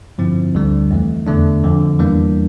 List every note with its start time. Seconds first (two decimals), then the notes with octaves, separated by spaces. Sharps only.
0.18 G2 D3 F3 C4 E4
0.54 D2 D3 G3 D4
0.91 F2 E3 A3
1.27 E2 D3 A3 D4
1.63 F2 D3 F3
1.99 E2 E3 G3 A#3 D4